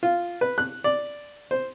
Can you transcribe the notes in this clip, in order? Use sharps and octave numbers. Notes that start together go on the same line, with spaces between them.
F4
B4
F#6
D5
C5